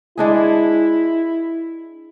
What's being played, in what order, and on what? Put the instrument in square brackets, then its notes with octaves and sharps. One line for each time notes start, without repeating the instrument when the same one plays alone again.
[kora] G#3 D4 G#4 [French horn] E4